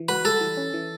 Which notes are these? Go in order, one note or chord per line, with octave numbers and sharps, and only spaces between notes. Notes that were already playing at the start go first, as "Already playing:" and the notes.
Already playing: E3
F#4 B4
G3 A4
E3
C#4
E3